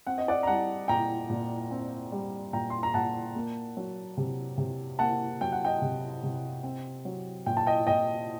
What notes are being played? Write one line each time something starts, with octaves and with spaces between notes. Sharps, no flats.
C4 F#5
D#5
D5 F#5
A#5
G3 F#5 A5
A#2 G5 A#5
A#2
C4
G3
A#2 G5 A#5
C6
A#5
A#2 F#5 A5
A#3
F#3
C3
C3
A#3 F#5 A5
F#3 G5
F#5
D#5 G5
C3
C3
C4
F#3
A#2 G5
A5
D#5 G5
A#2 D#5 G5